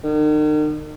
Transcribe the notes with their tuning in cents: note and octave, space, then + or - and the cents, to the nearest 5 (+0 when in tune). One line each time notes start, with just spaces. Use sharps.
D#3 -40